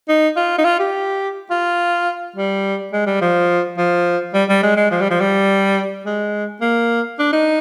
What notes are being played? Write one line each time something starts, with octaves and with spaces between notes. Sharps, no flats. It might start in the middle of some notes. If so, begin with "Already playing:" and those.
D#4
F4
D#4
F4
G4
F4
G3
G#3
G3
F3
F3
G3
G3
G#3
G#3
F3
G3
F3
G3
G#3
A#3
D4
D#4